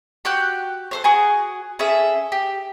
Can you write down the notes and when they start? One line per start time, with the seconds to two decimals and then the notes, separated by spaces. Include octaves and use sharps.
0.25 F#4 G4 F#6 G6
0.91 A4 C5 C#5
1.04 F#4 G#4 G#5
1.79 C#4 G#4 A4 E5
2.32 G4